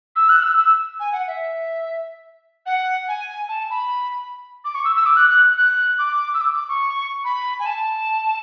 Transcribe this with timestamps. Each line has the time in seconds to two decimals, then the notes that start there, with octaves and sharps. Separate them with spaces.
0.16 E6
0.29 F#6
0.43 E6
0.57 E6
1.00 G#5
1.13 F#5
1.27 E5
2.66 F#5
3.08 G#5
3.49 A5
3.70 B5
4.65 D6
4.75 C#6
4.85 E6
4.96 E6
5.06 D6
5.16 F#6
5.30 F#6
5.58 F#6
5.99 D6
6.34 E6
6.41 D6
6.55 D6
6.69 C#6
7.25 B5
7.59 G#5
7.66 A5